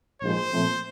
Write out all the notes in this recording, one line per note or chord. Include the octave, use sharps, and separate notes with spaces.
A#1 G#2 F3 G#3 C5
A#2 F3 A3 C4